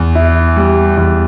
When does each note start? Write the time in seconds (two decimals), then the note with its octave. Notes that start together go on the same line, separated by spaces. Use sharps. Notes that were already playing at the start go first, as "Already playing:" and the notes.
Already playing: E2
0.15 E4
0.56 G3
0.97 E2